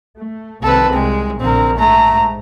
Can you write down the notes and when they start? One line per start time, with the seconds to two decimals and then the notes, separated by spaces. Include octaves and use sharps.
0.18 A3
0.63 C2 D#3 C4 A4 B4
0.93 C2 G#3
1.40 A#1 F#2 D3 C4 A#4
1.77 G#2 A3 A#5
2.11 G#2